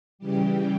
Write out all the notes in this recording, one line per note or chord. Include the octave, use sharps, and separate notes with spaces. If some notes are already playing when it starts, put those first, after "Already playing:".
C#3 E3 G3 G4